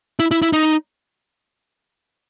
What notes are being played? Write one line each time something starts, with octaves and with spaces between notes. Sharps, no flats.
E4
E4
E4
D#4